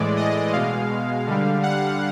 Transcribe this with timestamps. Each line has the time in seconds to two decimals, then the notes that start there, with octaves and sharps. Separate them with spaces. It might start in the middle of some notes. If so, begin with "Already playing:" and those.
Already playing: A2 E3 G#3 D5
0.17 D#5
0.53 B2 G#3 F5
1.27 D3 G3
1.63 F#5